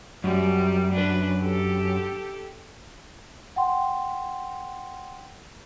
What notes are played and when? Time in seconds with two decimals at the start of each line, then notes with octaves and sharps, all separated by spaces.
0.24 F#2 G3
0.94 D4 B4
1.42 G4 A4
3.56 F#5 G5 C6